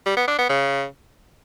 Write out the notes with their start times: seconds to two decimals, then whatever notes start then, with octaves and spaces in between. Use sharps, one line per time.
0.06 G3
0.17 B3
0.28 D4
0.39 B3
0.49 C#3